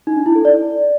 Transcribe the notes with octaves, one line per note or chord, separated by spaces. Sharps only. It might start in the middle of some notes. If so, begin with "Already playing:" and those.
D#4
D4
E4
A4
D5